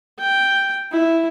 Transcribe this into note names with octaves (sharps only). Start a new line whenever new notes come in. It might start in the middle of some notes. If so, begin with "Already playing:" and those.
G5
E4